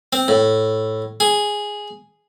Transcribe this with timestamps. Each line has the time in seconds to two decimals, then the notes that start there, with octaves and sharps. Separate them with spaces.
0.13 C4
0.28 A2
1.20 G#4